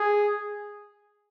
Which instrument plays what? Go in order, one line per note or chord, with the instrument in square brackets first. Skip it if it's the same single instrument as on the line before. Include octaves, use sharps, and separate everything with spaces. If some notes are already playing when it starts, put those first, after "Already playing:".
Already playing: [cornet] G#4